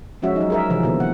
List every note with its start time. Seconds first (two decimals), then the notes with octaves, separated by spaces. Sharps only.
0.22 F3 G#3 C#4 F#4 E5
0.36 F#3 D#4
0.50 G#4 A#4 E5
0.70 C3 E3 F3
0.83 B2 D3 A#3
1.00 F#5